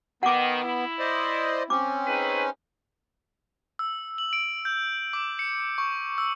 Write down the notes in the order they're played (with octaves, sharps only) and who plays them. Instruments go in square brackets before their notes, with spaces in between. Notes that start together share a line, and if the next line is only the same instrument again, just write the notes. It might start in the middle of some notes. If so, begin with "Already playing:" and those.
[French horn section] D#3 [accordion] B3 [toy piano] F#5 D6
[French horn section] E4
[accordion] C5 D5 D#5
[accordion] C4 C#4 [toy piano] D6
[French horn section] D#4 G#4 B4
[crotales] E6
F#7
D7
G6
D6
C#7
C#6
E6